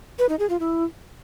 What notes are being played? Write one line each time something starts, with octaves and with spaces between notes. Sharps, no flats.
B4
D#4
G#4
F4
E4